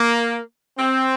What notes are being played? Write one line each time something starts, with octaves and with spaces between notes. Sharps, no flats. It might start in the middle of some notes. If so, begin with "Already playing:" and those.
Already playing: A#3
C4